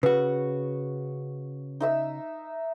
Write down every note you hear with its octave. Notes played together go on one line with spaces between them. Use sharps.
C#3 F#4 B4
D#4 E5 E6